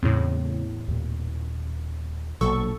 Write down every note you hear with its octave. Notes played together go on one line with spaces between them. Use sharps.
E2 A2 C#3 C4
D#2 A#2
A#1 B2 F#3 A#3 A4 C#6